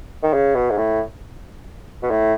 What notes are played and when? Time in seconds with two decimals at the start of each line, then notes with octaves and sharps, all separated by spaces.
0.23 D#3
0.33 C#3
0.55 B2
0.70 G#2
0.78 A2
2.02 B2
2.10 A2